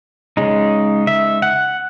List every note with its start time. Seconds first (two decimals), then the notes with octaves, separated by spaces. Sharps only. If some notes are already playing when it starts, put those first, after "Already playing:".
0.37 C#3 G#3 D#4
1.07 E5
1.42 F#5